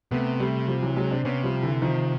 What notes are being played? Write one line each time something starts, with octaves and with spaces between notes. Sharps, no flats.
C3 A3 B3
G3 A3
F3 G3
E3 F#3
F#3 G#3
C4 D4
C3 B3 C#4
F3 G3
D3 E3
D#3 F3